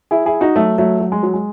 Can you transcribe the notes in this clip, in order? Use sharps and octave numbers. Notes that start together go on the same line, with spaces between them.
E4 G#4
E4 G#4
D#4 F#4
F#3 A3
F#3 A3
F#3
G#3
F#3
G#3